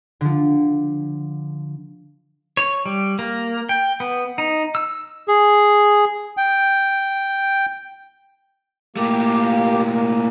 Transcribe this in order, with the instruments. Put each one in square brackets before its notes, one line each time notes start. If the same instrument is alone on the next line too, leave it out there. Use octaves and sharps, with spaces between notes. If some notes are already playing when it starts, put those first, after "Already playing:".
[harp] D3 F3
[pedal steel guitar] C#5
G3
A#3
G5
B3
D#4
E6
[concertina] G#4
G5
[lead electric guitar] A#2 A3 [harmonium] A#3 G4
[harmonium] A#3